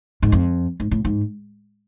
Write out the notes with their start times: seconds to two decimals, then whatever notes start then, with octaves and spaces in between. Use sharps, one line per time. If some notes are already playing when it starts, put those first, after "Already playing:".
0.23 G#2
0.32 F2
0.80 G#2
0.91 A2
1.05 G#2